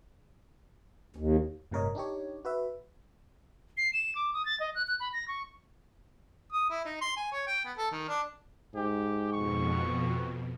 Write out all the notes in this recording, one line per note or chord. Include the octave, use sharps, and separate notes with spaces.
D#2
G1 A2 C3 A#4 C#5 D#5
D4 D#4 G4 C#5
F#4 B4 E5
C7
E7
D6
D#6
A6
D#5
F#6
F#6
B5
A#6
C#6
D#6
E4
D#4
C6
G#5
C#5
G5
B3
A4
D#3
D4
G#2 G4
F2 B2 C#6